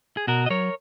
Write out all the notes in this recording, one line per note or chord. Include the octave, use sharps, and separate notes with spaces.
G#4
B2 F#4 A#4
D#5
F#3 A#4 C#5